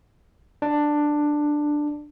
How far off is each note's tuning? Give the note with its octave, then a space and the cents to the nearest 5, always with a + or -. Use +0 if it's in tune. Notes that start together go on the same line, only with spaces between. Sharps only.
D4 +10